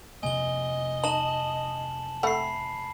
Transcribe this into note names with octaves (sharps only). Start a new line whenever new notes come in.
F2 C3 A#3 D#5 G#5 G7
D#4 A5 E7 F#7
A3 C4 F#5 B5 C7